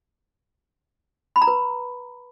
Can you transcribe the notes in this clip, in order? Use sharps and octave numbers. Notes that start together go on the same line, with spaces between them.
B5
A#5
B4